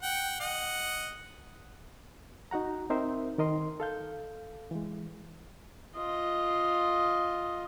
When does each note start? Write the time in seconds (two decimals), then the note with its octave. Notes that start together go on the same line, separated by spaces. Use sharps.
0.03 F#5 G5
0.40 D#5 F#5
2.51 D#4 F#4 F#5 A#5
2.90 C4 D#4 A#4 C5 E5
3.38 D#3 A#4 D#5 C6
3.80 A4 F5 G6
4.71 E3 G#3
5.96 F4 D#5